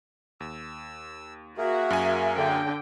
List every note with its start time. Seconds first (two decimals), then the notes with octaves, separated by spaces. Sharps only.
0.40 D#2 E6
1.58 A#3 F#4 G#4 A#4 E5
1.90 F#2 G#5
2.36 D3 G5